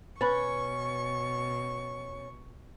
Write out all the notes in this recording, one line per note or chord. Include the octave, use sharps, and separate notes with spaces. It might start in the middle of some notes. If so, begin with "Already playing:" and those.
B2 C#4 B4 B5 C#6 A6